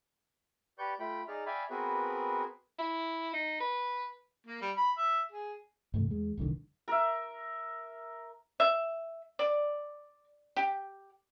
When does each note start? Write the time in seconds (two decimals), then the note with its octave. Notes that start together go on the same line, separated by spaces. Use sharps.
0.78 G4 B4 D5 C#6 G6
0.99 A3 F4 G5 B5
1.28 D#4 G#4 D5 F6
1.46 D5 E5 F5 G5 G#5 B5
1.70 B3 C4 F#4 G#4 A#4 B4
2.79 E4
3.34 D#4
3.60 B4
4.47 A#3
4.61 G3
4.77 B5
4.97 E5
5.32 G#4
5.94 G2 C3 E3 A3
6.07 E2 G#3
6.38 F1 C2 D3 D#3
6.88 A#4 E5
8.60 E5
9.39 D5
10.56 G4